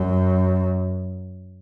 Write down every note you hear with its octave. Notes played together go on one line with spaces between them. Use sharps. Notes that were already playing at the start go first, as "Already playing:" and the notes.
Already playing: F#2